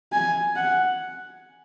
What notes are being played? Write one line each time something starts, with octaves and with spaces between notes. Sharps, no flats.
G#5
F#5